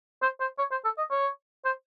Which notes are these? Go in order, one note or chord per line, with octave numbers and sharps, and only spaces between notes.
C5
C5
C#5
C5
A4
D#5
C#5
C5